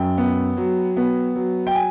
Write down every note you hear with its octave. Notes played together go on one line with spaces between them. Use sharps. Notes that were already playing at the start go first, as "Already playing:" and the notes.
Already playing: F#2 G5
B3
F#3
B3
F#3
G5
G#5